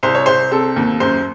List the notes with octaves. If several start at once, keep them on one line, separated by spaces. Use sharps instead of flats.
C2 C5
C#5
C2 C5
C4 A4
D#2
F#2 C5